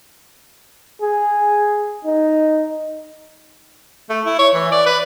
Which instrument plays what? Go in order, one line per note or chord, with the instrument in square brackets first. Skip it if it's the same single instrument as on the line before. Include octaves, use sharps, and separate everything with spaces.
[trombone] G#4
D#4
[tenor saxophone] A3
E4
C#5
E3
D5
B4